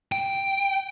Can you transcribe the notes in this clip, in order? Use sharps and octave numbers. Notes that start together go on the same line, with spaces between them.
G5